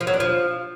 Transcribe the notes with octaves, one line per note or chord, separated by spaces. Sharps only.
F3
F#3
D4
F3